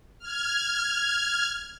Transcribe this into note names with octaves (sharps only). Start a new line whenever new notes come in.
F6 G#6